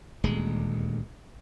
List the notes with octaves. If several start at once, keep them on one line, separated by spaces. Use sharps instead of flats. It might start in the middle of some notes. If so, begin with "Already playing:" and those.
D#1 D2 G#3